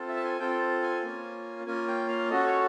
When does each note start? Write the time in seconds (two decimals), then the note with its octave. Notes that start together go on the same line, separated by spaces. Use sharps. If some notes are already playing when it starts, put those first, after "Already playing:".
Already playing: C4 F4 A4
0.08 E5
0.16 A5
0.24 G#5
0.40 C4 F4 A4 G5
0.82 G#5
1.03 A#3 C#4 F4 G#5
1.67 A#3 C#4 F4 G#5
1.88 G5
2.09 F5
2.30 C#4 F#4 A4 D#5
2.46 C#5